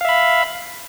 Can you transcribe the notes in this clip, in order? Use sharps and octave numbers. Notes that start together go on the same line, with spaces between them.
E5 F5 B5